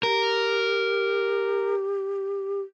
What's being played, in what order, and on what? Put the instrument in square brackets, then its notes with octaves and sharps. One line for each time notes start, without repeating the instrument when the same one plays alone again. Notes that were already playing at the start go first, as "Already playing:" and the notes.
[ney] G4 [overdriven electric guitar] A#4